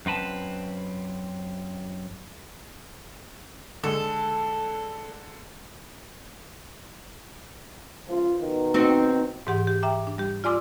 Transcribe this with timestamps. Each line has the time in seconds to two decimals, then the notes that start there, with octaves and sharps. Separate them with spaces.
0.06 F#2 C4 B4 A5
3.84 D3 G#3 A4
8.08 C#2 F3 F4
8.40 B2 D#3
8.74 C4 D#4 F#4
9.47 G#2 E3 G4 F#5 C6
9.67 G4
9.83 E5 G5 A#5 D6
10.07 D4
10.18 G3 G4
10.44 F4 D5 G#5 C6 D6 E6